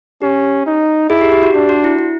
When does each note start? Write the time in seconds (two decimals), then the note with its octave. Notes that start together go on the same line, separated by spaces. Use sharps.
0.22 C#4 G4
0.66 D#4
1.09 E4 G#4
1.21 G4
1.32 G4
1.43 F#4
1.54 D4 F#4
1.69 F#4
1.84 E4
1.99 E4